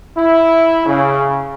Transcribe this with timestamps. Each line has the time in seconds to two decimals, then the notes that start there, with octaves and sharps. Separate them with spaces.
0.16 E4
0.86 C#3